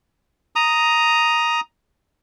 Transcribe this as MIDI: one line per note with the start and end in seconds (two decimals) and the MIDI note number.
0.56 1.60 82
0.56 1.60 87